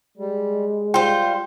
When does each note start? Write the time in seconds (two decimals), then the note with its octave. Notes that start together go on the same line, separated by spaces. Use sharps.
0.17 G3 G#3
0.94 G3 F4 C5 G5